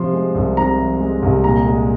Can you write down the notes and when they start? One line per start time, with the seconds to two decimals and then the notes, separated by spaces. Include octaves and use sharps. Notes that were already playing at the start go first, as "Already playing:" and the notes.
Already playing: C3 F3 C6
0.13 G#3
0.35 C2
0.57 C3 A#5
0.78 F3
1.00 G#3
1.22 C2
1.44 A#2 A#5
1.66 G#3